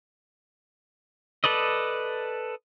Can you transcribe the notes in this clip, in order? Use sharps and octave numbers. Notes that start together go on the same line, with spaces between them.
A4 B4 D5 D#5